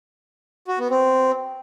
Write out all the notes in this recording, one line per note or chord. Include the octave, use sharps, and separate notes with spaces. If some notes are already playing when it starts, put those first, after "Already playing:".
F#4
B3
C4